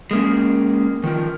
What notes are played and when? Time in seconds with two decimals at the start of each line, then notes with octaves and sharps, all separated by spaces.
0.11 G#3 A#3 C#4
1.04 D#3 F3 A#4